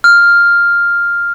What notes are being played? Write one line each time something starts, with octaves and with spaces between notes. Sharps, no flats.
F6